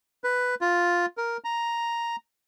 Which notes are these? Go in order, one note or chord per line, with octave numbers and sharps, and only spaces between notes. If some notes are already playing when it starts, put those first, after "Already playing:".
B4
F4
A#4
A#5